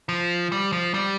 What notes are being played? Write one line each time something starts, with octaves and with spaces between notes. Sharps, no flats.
F3
G3
F3
G3